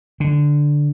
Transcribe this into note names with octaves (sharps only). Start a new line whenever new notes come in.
D3